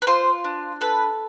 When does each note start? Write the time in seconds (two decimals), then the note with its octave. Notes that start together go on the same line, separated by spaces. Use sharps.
0.02 B4
0.07 F4 C5
0.44 D4
0.81 A4 B4